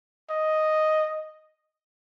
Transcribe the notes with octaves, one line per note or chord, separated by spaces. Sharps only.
D#5